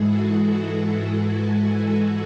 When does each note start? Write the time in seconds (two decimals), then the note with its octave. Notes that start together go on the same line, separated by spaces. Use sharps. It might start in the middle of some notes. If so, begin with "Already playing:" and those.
Already playing: G#2 E3 G#3 E4 F#4 G#4 A4
0.29 E4 G#4
0.74 F#4